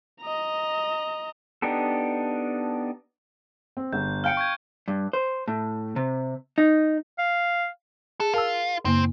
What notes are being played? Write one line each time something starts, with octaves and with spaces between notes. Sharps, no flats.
D#5 A#5
B3 D4 D#4 G4 A4
C4
G1 G6
F5 G5 F6 G6 C#7 D7
C#6 G6 G#6
G2
C5
A2
C3
D#4
F5
G#4 A4
F4 A#4 A5 E6
F#2 C#3 A#3 C4